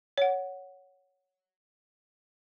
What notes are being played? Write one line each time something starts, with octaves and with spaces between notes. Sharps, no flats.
C#5 F#5